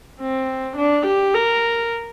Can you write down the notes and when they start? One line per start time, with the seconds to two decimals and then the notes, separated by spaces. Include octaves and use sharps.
0.20 C4
0.77 D4
1.07 G4
1.35 A#4